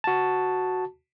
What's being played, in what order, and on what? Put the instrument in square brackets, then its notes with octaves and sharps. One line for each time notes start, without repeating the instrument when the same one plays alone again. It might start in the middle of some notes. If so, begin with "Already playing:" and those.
[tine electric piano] F#4 A5